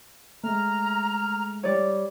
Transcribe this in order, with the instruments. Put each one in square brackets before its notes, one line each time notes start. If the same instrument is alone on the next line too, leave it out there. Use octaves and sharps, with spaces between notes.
[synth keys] G#3 A3 [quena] A#5 [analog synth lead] F6
[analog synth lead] G3 [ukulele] C#5 D5